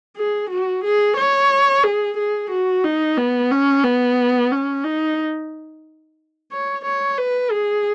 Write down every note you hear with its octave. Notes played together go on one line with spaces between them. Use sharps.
G#4
F#4
G#4
C#5
G#4
G#4
F#4
D#4
B3
C#4
B3
C#4
D#4
C#5
C#5
B4
G#4